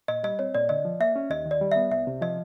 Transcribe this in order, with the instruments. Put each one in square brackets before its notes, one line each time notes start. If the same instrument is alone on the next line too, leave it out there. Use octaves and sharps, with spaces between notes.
[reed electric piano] A#2 [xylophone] D#5
[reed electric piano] G3 [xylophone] D#5
[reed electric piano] C4 [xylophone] C#5
[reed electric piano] A#2 [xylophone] D5
[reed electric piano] D3 [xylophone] D#5
[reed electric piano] F3
[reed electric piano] A#3 [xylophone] E5
[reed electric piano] C#4
[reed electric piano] D#2 [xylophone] D#5
[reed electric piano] D#3
[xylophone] D5
[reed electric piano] G3
[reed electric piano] B3 [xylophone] E5
[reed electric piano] C2 [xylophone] E5
[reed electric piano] C3
[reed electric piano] F3 [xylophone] D#5